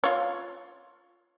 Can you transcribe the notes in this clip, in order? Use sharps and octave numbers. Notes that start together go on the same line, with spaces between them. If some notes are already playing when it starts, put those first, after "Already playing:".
F4 C#5